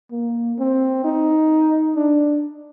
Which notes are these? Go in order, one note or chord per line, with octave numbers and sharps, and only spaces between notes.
A#3
C4
D#4
D4